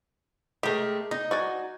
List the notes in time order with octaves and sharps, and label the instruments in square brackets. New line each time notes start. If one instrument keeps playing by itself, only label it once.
[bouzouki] G#3 A3 [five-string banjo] G4 A#4
[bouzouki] D#4 [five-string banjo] D#5
[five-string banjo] F#4 D5 G#5